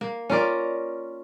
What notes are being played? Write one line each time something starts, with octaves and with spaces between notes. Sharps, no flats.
A#3
C#4 F4 A#4 D5